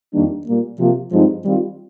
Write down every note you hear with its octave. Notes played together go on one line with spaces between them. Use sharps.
F2 D#3 G3 A#3 D4
A#2 G3 A#3
C3 F3 A#3 F4
G2 F3 G#3 C4 D#4
D#3 G3 C4 F4